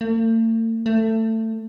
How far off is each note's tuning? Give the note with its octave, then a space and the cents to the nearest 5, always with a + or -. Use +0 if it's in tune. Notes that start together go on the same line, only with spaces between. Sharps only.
A3 +45
A3 +20